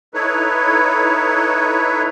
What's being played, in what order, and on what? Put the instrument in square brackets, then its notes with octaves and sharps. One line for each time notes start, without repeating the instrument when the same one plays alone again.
[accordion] D#4 E4 A4 B4 C#5